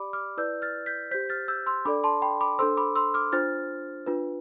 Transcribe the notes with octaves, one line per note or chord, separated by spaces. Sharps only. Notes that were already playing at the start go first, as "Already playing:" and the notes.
Already playing: G4 D5 B5 D6
D6 F6
E4 B4 D5 E6 G6
F6 A6
G6 B6
G4 C5 G6 B6
F6 A6
E6 G6
C6 E6
D4 A4 D5 B5 D6
A5 C6
G5 B5
B5 D6
D4 A4 C5 C6 E6
B5 D6
C6 E6
D6 F6
D4 F4 C5 F6 A6
D4 F4 B4